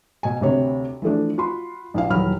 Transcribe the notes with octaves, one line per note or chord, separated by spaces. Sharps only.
B2 G#5
D2 C3 C#5
E3 F3 A3 D4
F4 F#4 B5 C6
A#1 E4 F5
D#1 E3 F#3 B5 F6